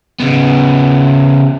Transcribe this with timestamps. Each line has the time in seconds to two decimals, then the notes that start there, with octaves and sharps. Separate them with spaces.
0.20 C#3 B3